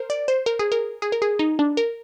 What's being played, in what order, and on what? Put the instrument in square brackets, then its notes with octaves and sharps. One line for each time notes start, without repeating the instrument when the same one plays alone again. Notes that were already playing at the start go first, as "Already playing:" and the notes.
Already playing: [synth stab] A#4 C5
D5
C5
A#4
G#4
A#4
G#4
A#4
G#4
D#4
D4
A#4